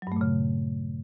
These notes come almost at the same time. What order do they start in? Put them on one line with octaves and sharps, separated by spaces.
F#3 G2 A3 A#2 C#3